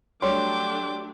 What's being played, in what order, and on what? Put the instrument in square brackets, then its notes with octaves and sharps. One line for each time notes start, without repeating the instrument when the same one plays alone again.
[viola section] F#3 A3 D4 [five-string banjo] G3 C#5 [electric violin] G5 D6 [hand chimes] C6